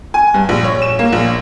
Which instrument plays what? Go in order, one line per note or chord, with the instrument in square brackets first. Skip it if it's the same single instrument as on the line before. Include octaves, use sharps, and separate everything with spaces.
[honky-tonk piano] G#5
G2
A#1
C#5
E7
A#3
A#1